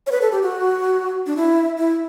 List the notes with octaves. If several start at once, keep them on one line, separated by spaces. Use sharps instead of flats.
C#5
B4
A4
G4
F#4
D4
E4
E4